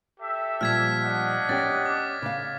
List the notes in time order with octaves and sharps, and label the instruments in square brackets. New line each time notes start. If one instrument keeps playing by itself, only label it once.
[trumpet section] G4 A4 E5
[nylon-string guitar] A#2 F3 G3 [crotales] F6 G#6 B6
[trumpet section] D4 D#5 F#5
[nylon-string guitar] C#4 G4 [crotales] A6
[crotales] D6
[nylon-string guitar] C#3 F5